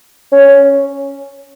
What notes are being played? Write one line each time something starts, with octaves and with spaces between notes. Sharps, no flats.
C#4